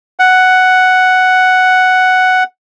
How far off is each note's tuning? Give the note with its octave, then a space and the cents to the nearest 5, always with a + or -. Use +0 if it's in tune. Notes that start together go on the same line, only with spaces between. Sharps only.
F#5 +5